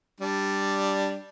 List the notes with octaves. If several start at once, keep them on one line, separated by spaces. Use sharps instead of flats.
G3 D4